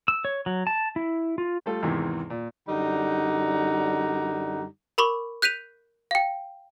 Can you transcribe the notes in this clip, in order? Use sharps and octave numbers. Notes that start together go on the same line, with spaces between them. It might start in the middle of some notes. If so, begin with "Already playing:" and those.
E6
C#5
F#3
A5
E4
F4
G3 A3 F4 A4
E2 G#2 C3 D#3 E3
A#2
F#2 D3 G3 D#4 F#5 A#5
A#4 B5 C#6 D6
F#6 G6 B6 D#7 F7
F5 G5